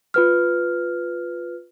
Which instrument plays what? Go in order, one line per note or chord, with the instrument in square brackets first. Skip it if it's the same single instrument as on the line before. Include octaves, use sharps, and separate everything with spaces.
[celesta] F4 B4 F6